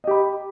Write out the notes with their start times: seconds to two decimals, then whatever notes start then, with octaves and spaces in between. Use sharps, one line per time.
0.04 D#5
0.07 G4
0.11 B5